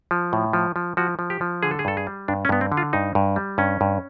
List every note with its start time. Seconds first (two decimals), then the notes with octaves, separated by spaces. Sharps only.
0.11 F3
0.33 A2
0.53 F3
0.76 F3
0.97 F3 F#4
1.19 F3
1.30 G4
1.41 F3
1.63 D3 G#4
1.71 A4
1.79 G#4
1.85 G2 A4
1.97 G#4
2.07 G3
2.28 G2 D4
2.45 C#4
2.49 G2 B3
2.61 C4
2.72 D3
2.77 F4
2.93 G2 D#4
3.15 G2
3.36 G3
3.58 G2 C#4
3.81 G2